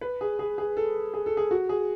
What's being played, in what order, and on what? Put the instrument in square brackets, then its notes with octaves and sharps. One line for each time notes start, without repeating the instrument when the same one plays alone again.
[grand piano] B4
G#4
G#4
G#4
A4
G#4
A4
G#4
F#4
G#4